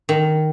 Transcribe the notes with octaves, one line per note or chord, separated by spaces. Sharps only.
D#3